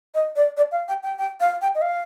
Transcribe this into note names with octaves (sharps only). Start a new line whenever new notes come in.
D#5
D5
D5
F5
G5
G5
G5
F5
G5
D#5
F5